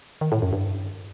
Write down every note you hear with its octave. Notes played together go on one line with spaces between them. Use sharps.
D#3
A2
F#2
G2